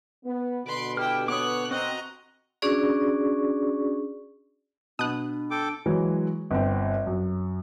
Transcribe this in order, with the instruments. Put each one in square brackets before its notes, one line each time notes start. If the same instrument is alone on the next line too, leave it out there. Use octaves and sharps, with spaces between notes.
[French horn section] B3
[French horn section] B2 D3 [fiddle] B4 C6 [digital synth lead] D7
[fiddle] E4 G5 [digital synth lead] G4 [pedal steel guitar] F6
[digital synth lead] B3 [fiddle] C#5 F#6 [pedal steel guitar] D6 D#6
[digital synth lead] C4 [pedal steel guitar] F#4 F#6 [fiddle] D#5 A#5
[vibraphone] C#4 D4 F#4 G#4 D5 C#6
[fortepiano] B2 [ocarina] D4 [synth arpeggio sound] D#6 F#6
[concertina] A4 G5 D6
[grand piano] E3 F#3 G#3
G1 C4
F#2